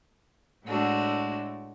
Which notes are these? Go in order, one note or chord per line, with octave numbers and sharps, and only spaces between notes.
A2 G#3 A3 D4 F#4